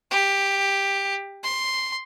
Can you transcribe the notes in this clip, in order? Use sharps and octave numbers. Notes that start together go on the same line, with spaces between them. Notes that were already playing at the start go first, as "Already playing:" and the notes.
G4
C6